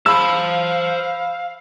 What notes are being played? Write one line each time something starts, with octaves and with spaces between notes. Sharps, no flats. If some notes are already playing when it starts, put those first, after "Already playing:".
C5 F5 A5 B5 E6